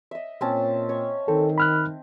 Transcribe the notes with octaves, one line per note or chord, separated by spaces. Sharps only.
D#5 E5
A#2 C4 C#4 A5
C#5 C#6
D#3 C4 A4
B5 F6 F#6